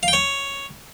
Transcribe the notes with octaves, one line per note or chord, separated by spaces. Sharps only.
F5
G5
C#5